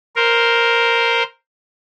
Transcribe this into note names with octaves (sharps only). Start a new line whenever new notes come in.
A#4 C5